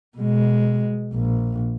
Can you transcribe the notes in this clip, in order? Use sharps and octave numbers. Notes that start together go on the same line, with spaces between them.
B2 G#3
A#1